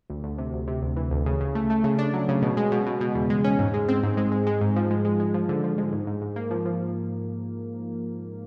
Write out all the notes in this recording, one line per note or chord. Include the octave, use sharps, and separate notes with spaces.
D2
D2
C3
D2
C3
D2
E3
D2
C#3
C#3
A3
A3
C#3
D4
F#3
C#3
B2
G#3
B2
B2
B2
E2
G#3
C#4
G#2
G#3
C4
G#2
G#3
G#3
G#3
G#2
F3
G#3
G#3
G#3
F3
D3
F3
G#3
G#2
G#2
G#2
A#3
F3
F3